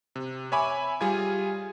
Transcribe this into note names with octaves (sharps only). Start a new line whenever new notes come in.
C3
C#5 E5 G#5 B5 D6
G3 F4 G#4 G#5 G#6